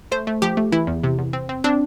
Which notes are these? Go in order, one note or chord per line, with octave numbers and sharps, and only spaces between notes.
A3 C5
A3
F3 G4
A3
E3 E4
E2
C3
E2
C4
C4
C4 D4